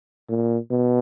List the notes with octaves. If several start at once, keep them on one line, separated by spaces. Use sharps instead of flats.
A#2
B2